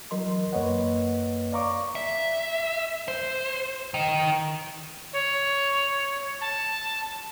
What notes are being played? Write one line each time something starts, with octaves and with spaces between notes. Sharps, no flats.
E3 F#3 A#4 D#5 C6
F#2 A#3 B4 C#5 D#5 F#5
D5 F5 A#5 C#6 D6
E5
C5
D#3
C#5
A5